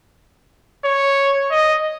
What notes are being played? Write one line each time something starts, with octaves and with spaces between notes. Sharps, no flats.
C#5
D#5